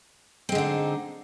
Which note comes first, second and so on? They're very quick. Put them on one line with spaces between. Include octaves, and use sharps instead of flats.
C4 G#3 D3 D#4